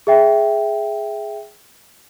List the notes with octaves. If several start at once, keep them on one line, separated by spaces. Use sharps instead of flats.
G#4 E5 G5